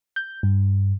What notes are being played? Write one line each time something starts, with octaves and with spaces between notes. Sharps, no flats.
G6
G2